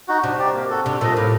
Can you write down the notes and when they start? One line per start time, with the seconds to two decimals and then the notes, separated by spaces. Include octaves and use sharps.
0.08 D#4 F#4
0.23 C3 D4
0.38 G4 D5
0.54 A#3
0.70 F#4 A4
0.86 C3 D4
1.00 A#2 A4 D#5
1.16 A2 A#3